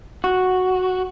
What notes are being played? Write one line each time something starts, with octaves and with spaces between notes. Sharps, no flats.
F#4